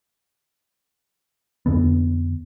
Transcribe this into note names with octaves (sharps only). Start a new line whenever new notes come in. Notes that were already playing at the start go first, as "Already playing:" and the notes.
F2 D3 B3